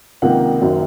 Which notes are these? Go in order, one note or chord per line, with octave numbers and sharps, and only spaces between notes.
C#2 C3 D#3 A#3 F#5
F#1 F#2 D#3 F#3